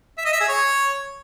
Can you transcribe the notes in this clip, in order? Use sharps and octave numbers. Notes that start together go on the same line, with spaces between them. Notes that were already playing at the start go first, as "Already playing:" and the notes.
E5
D#5
E5
G#4
C#5